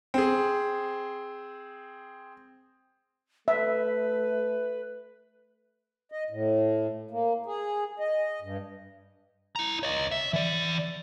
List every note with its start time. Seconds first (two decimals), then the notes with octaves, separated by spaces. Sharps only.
0.14 C4 G#4
3.48 A3 B4 E5
6.12 D#5
6.30 A2
7.11 A#3
7.46 G#4
8.00 D#5
8.42 G2
9.56 E4 A#5
9.83 C#5 D#5
10.11 E5
10.33 E3 D5